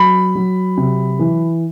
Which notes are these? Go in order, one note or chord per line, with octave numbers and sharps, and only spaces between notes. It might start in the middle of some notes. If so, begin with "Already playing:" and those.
Already playing: F#3 B5
F#3
C3
E3